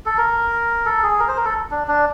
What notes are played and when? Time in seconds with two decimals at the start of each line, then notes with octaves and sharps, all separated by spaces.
0.06 A4
0.18 A#4
0.86 A4
1.03 G#4
1.19 A#4
1.28 C5
1.37 A#4
1.45 A4
1.71 D4
1.87 D4